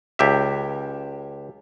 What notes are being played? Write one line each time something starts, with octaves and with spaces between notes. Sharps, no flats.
C#2 G4 E5